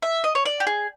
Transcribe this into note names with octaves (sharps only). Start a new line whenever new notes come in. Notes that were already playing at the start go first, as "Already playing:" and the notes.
E5
D#5
C#5
D5
G4
G#4